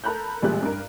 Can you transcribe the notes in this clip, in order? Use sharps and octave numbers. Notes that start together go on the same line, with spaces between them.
A4 A#4 A#5 B5 F#6 G6
A1 A#2 G3 G#3 G4 F#6
G2 A#4